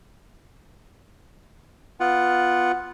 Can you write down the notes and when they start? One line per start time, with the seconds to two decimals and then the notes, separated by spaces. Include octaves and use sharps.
2.00 B3 F4 F#5